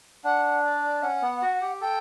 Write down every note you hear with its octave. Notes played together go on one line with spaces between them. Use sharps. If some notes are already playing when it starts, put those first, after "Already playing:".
D4 F#5
D5
C#4 F#5
B3
F#4
G4
A4 G5